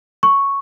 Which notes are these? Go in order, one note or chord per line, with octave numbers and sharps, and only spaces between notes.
C#6